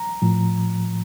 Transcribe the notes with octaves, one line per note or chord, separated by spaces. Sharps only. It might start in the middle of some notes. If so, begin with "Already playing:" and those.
Already playing: A#5
A2 F3